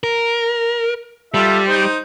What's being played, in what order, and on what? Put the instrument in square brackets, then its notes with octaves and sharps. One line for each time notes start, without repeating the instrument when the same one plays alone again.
[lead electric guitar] A#4
[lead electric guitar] G3 [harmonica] F4 A4 E5
[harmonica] D#4 C5